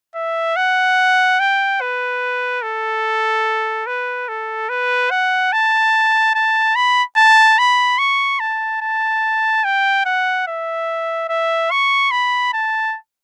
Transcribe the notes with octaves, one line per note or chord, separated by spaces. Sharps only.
E5
F#5
G5
B4
A4
B4
A4
B4
F#5
A5
A5
B5
A5
B5
C#6
A5
A5
G5
F#5
E5
E5
C#6
B5
A5